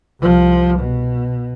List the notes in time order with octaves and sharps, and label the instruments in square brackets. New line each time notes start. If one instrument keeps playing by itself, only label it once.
[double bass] C2 F3
B2